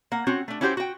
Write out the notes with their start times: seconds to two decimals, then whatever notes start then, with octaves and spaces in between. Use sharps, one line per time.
0.12 A#3 F#5
0.27 C4 C#4 F#4
0.48 A3 D4
0.61 C#4 E4 F#4 G4 B4 C5
0.77 F#4 G5